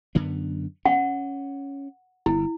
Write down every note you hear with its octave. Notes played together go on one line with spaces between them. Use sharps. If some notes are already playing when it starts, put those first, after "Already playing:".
F#2 D3 B3
C#4 F#5
G1 E4